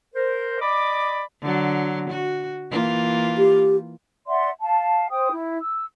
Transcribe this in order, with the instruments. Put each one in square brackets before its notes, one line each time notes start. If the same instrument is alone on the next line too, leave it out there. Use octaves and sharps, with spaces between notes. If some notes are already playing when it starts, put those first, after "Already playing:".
[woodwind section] A#4 C5
D5 D#5 B5 D6
[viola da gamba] D3 F#3
F#4
E3 A#3 F4
[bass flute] G4
[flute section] D5 E5 F#5 C6
F5 A5
C5 G5 D#6
E4
E6